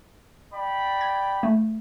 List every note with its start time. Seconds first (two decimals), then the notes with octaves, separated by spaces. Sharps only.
0.53 D5 G5 B5
1.01 G#6
1.43 A3